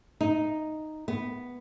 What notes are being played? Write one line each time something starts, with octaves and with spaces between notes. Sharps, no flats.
D#4
B3